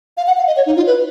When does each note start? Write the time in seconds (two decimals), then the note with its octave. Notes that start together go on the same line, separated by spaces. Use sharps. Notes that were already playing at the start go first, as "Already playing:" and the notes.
0.17 F5
0.27 F#5
0.37 F5
0.47 D#5
0.57 C#5
0.66 D#4
0.76 F4
0.87 B4